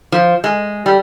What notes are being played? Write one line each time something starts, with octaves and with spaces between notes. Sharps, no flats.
F3
G#3
G3